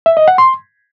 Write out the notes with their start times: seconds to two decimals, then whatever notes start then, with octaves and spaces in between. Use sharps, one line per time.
0.06 E5
0.17 D#5
0.28 F#5
0.38 C6